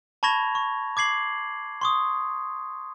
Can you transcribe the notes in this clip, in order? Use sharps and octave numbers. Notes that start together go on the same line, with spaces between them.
A5 B5 C#6 G#6 A#6 F7
C#6
D6 G#6 C7 F#7
C6 C#6 D#6